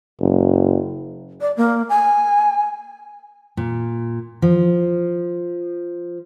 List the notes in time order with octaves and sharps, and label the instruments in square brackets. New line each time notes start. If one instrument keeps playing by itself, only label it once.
[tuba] F#1
[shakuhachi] D5
A#3
G#5
[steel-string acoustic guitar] A#2
F3